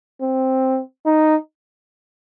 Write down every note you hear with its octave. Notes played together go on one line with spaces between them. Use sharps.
C4
D#4